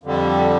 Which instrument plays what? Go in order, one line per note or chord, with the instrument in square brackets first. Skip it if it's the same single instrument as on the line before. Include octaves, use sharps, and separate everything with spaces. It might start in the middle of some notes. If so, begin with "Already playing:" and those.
[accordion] F2 D3 G3